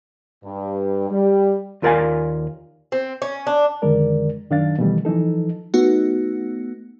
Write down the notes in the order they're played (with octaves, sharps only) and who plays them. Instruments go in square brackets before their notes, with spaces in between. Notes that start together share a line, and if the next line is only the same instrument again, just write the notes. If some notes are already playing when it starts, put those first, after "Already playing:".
[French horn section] G2
G3
[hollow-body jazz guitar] D#2 F4 A#4 D5 F5 G#5
[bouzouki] C4
C#4
D4
[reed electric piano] F2 D3 D#3 G#3 A#4 D5
F#2 D#3 D4 F5 A6
B2 D#3 E3 G3 A3
E3 F3 D#4 A4
[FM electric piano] A3 B3 D#4 F#4